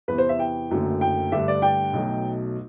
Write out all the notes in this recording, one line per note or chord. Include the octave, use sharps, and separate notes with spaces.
E2 C3 E3 B3 B4
C5
E5
G5
F#1 F#2 D3 F#3 A3
G5
G2 D3 A3 D4 E5
D5
G5
B1 B2 F#3 A3